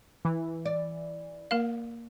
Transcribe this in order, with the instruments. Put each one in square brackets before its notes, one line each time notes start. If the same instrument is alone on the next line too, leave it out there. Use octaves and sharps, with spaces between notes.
[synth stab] E3
[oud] D5
[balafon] A#3 A#4 F5